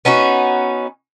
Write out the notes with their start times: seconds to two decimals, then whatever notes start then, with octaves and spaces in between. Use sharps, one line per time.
0.05 B3 C#4 D#4 F#4